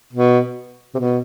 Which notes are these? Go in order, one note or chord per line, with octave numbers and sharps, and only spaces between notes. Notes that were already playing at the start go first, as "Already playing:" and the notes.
B2
C3
B2